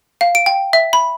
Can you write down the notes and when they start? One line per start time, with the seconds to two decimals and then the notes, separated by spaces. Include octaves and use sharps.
0.21 F5
0.35 D7
0.46 G5
0.73 E5
0.93 B5